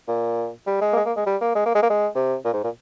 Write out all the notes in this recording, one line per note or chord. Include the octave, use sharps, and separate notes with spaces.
A#2
G3
G#3
A#3
G#3
A#3
G#3
G3
A#3
G#3
A#3
G#3
A#3
G#3
C3
A#2
G#2
A#2